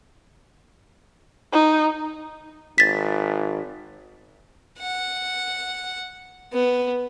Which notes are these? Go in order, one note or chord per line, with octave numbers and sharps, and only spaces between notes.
D#4
G#1 A6 B6
F#5
B3